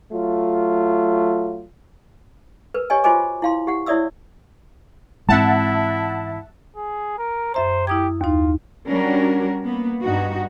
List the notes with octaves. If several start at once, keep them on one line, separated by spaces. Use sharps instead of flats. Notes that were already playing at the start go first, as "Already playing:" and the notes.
F#3 A3 F4
A#4 B4
G4 C#5 D#5 G#5
F4 F#4 C5 D#5 G#5 D6
E4 F5 C6
G4 F#5
E4 C#5 D5 E5 D#6 E6
G#2 E3 G#3 C4 E4 E5 F#5 A5
G#4
A#4
F#2 C5 E5 A#5
E4 G4 D#6 G#6
D#2 D#4 F4
G3 C#4 D4 F#4 A#4
A#3 B3
G2 D#4 F#4